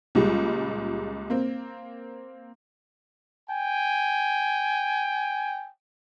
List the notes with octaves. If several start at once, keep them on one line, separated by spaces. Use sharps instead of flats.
C#2 A#2 G3 G#3
A#3 C4
G5 G#5